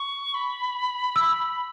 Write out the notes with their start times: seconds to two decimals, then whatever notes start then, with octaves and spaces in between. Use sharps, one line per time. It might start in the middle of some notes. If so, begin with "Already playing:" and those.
Already playing: C#6
0.34 B5
1.16 E6